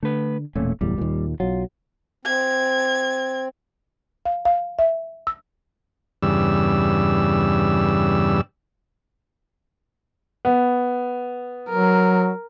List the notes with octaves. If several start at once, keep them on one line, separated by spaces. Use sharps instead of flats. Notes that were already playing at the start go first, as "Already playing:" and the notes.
D3 A3 B4
E1 A#2 A3 C#4
D1 E2 A2 G3
D#2 A#2
B1 F#3 F4
C4 G#6
F5
F5
E5
E6
E2 G2 C#3 G3 E6
B3
F#3 A#4